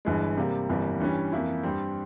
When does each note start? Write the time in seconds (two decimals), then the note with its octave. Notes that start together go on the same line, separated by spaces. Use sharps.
0.05 G1 G2 E3 G#3
0.37 C3 G3 A#3
0.69 G1 F2 E3 G3 A#3
1.00 G2 E3 G3 C#4
1.32 F2 E3 A#3 E4
1.63 G2 G3 C4